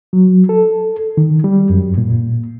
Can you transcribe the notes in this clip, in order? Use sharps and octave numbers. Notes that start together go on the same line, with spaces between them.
F#3
A4
D#3
G3
F#2
A#2